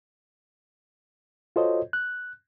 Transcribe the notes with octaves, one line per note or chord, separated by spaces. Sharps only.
F4 F#4 A4 C5 C#5 D#5
F#6